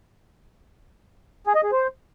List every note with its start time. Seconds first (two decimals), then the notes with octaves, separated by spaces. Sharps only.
1.47 G#4
1.55 D#5
1.64 G#4
1.72 C5